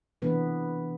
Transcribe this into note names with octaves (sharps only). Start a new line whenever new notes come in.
C3 E3 B3 D4 B4